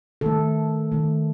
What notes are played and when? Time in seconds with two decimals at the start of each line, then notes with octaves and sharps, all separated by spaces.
0.21 D#3 A3 A4
0.92 D#3 A3